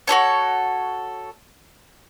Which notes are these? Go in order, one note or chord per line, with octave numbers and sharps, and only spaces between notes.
F#4 G4 A4 C#5